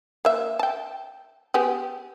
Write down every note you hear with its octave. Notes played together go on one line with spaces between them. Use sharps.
A#3 E5
G5 A5
B3 G4 G#4